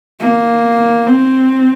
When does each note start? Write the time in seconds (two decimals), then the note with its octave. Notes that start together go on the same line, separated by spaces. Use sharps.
0.20 A#3
1.07 C4